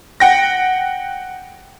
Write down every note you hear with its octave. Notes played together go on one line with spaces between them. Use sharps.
F#5 G5 A#6